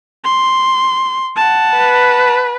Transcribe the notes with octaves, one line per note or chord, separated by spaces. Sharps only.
C6
F#5 A5
B4